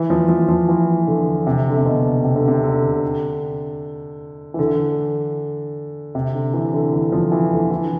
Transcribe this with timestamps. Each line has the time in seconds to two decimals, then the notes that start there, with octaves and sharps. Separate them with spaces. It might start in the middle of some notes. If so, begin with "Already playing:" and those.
Already playing: E3
0.10 F3
0.29 F3
0.49 F3
0.69 E3
1.07 D3
1.47 C3
1.70 D3
1.78 C3
1.86 B2
2.24 C3
2.36 D3
2.48 C3
2.63 D3
4.54 E3
4.59 D3
6.15 C3
6.34 D3
6.54 E3
6.73 D3
6.93 E3
7.12 F3
7.32 E3
7.51 D3
7.71 E3